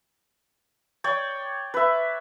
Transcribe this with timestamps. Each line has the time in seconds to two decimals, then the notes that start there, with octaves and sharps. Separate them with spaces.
1.04 C#5 D5 G5
1.74 B4 E5